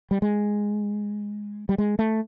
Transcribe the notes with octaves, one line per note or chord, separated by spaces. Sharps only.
G3
G#3
G3
G#3
A3